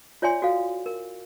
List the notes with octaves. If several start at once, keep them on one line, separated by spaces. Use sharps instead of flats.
F4 C#5 D5 E5 G#5 C6
F#4 A4 F5
A#4